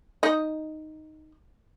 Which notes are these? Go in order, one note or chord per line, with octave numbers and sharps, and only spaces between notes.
D#4 D#5